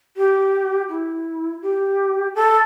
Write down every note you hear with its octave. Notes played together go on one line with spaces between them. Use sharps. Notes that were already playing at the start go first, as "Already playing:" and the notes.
G4
E4
G4
A4